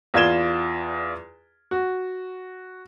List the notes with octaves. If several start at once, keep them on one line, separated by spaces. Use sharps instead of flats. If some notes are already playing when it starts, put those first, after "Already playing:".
E2 F4 D5 G#6 E7 G7
F#4